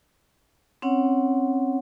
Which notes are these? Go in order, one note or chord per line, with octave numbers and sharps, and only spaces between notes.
C4 C#4 C#5 F#5